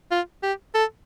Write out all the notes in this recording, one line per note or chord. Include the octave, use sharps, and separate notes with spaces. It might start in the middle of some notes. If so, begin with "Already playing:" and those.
F4
G4
A4